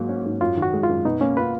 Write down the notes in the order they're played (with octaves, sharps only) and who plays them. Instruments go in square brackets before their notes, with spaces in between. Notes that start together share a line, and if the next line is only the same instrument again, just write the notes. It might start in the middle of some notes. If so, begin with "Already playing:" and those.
Already playing: [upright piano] G#2 F#3 F4 [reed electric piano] A#3
[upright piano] C#4
G#2
[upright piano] F#2 [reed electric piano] F4
[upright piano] D#3
[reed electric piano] F#4
[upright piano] G#3
[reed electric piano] F4
[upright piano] F#2
[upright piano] B2 [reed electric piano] D#4
[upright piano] A#3 [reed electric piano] C#4
[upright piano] F4 [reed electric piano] B4